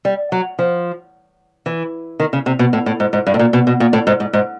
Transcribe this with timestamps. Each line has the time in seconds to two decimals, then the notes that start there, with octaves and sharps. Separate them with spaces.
0.05 G3
0.32 F#3
0.59 F3
1.66 E3
2.20 D#3
2.33 C#3
2.46 C3
2.59 B2
2.73 A2
2.86 A2
3.00 G#2
3.13 G#2
3.27 G2
3.34 A2
3.39 A#2
3.53 B2
3.67 B2
3.80 A#2
3.93 A2
4.07 G#2
4.20 G#2
4.33 G#2